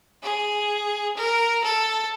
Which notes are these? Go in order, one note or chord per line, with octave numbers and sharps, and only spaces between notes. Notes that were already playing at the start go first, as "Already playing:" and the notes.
G#4
A#4
A4